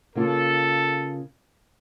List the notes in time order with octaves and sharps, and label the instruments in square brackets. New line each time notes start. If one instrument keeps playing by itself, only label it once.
[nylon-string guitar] C#3 A#3 F4 [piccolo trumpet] A4